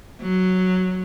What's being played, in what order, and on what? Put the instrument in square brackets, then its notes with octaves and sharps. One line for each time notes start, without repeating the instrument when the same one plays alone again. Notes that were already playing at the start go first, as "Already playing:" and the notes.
[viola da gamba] F#3